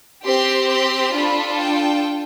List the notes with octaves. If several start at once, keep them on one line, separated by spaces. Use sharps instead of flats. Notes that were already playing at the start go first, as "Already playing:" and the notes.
C4 G4 C6
C6
D4 F4 A4 B5
G5